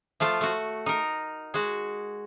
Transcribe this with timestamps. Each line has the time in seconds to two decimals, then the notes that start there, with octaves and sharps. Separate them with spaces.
0.20 F3 A3 F4 A5
0.41 A3 F#4
0.86 D#4 A#4
1.54 G#3 F#4